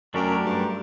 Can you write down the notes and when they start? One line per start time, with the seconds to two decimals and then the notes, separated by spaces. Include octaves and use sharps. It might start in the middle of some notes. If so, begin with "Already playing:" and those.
0.14 F#2 F#3 A3 D4 G4 A#4
0.45 G2